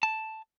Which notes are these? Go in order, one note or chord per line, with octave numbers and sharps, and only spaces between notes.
A5